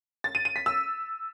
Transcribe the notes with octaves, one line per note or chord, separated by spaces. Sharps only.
A6
D#7
D#7
B6
E6